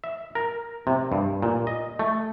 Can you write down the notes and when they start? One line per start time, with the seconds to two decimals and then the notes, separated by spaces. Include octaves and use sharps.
0.04 E5
0.35 A#4
0.87 C3
1.12 G2
1.42 A#2
1.67 D#5
1.99 A3